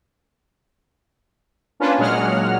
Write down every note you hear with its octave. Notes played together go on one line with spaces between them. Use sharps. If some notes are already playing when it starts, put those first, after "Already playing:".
A#3 C#4 D4 F4 B4
A#2 F#3 G#3 F#5 F6